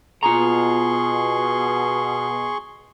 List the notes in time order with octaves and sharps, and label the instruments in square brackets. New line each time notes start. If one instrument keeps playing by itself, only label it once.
[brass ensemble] B2 [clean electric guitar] F4 A#5 [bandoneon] G#4 C6 C#6